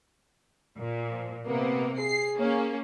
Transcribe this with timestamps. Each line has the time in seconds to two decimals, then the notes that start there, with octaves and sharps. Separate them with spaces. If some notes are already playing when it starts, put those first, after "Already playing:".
0.78 A#2
1.11 F3
1.46 C3 A#3 B3
1.99 G#4 C7
2.37 A#3 C#4